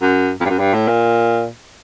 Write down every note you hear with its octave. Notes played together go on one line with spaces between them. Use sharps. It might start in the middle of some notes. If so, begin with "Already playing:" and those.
F#2
F2
G2
F#2
G2
A2
A#2